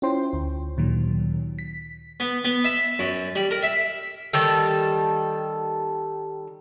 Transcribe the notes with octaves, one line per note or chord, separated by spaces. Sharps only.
C#4 E4 F4 C5 G5 C6
D2
D2 A#2 D#3 F#3
B6
B3
B3
E5
F#2
G3
A#4
E5
D#3 G3 A4